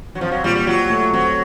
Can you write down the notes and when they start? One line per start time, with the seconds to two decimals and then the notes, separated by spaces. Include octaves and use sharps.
0.15 F#3
0.21 F3 C4
0.32 F#3
0.44 A#2 G3
0.55 G3
0.67 F3 F#3
0.90 A3
1.13 F#3 C4